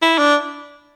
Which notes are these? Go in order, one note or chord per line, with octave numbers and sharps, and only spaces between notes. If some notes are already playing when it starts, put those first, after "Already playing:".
E4
D4